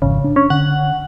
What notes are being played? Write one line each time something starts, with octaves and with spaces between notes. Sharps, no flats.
G#1 F2 C#3
D4
C#4
D3 F#5